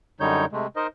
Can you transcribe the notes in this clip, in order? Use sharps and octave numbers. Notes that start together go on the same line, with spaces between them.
F#2 D3 G3 D#4 C#5 G6
C3 G#3 A3
D#4 A#4 C5 D#5